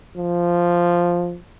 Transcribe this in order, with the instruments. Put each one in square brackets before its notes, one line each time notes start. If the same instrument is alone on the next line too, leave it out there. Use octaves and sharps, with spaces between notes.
[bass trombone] F3